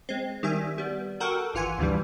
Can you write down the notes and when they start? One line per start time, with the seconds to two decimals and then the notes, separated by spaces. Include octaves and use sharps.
0.09 G#3 C4
0.43 D#3 G3 E5 G#5
0.78 G3 B3
1.20 F#4 A4 A#4 F#5 G5
1.54 G#1 E3 F4 F#5 G#5
1.79 D2 G2 B2 E3 G3